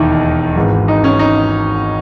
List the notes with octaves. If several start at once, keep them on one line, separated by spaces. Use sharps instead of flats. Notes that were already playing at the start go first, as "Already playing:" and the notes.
Already playing: E1 D#2 D#3 D#4 E4
G#1 G#2 E3
D#4
C#4
D#4